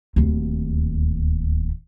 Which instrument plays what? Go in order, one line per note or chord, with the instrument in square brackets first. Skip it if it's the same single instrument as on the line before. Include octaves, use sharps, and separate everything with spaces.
[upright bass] D1 D#2